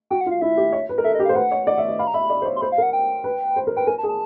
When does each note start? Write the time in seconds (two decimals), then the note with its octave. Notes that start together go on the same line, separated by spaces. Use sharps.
0.11 F#4 G5
0.21 F#5
0.26 F4
0.31 F5
0.41 E4 E5
0.57 G4
0.72 C#5
0.89 B4
0.98 A#4
1.04 A4 E5
1.15 D#5
1.20 G4
1.25 F5
1.29 C5
1.35 B4 F#5
1.51 C#5
1.67 D5
1.78 E5
1.88 D#5
1.99 F5 B5
2.07 A#5
2.14 E5 B5
2.30 D5
2.42 C5
2.45 C#5
2.56 C6
2.61 C5 B5
2.72 F5
2.78 A#4 F#5
2.93 G5
3.24 B4
3.56 C5
3.67 A#4
3.77 B4 G5
3.87 A#4 G#5
3.98 A5
4.03 G#4
4.09 A5